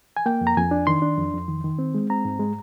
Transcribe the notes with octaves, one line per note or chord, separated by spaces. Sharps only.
G#5
A#3 G5
F2
A#5
F2 G#5
D4
D#3 C6
D4
F2
F2
D#3
D#3
C4
G#3
C4 A#5
G#2
G#3